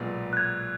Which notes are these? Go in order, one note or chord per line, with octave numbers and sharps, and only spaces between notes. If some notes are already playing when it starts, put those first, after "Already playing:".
Already playing: B1 A#2 G#3 B3
F#6
G#6